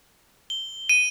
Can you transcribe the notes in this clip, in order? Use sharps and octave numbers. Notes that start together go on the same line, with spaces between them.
G7
D#7